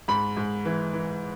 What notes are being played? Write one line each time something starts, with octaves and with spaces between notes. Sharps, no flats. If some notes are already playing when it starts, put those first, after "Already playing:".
G#2 B5
G#2
E3
E3